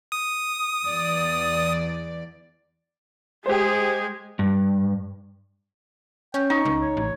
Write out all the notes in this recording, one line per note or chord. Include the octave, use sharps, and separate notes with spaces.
D#6
E2 D5
G#3 G4 G#4 C5
G2
C#4 G5
D#4 C#6
C#2
C#5
A1